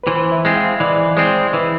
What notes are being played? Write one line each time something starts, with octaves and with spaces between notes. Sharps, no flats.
B4
E3 C5
E5
G#3 C4
F5
E3 D5
G#3 C4 C5
E3 B4